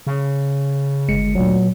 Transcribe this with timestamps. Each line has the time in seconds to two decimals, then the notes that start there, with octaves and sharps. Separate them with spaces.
0.07 C#3
1.09 G1 G#3 C#7
1.35 D2 A#2 F#3